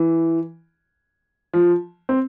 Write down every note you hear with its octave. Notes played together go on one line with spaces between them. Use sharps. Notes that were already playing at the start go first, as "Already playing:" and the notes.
Already playing: E3
F3
C4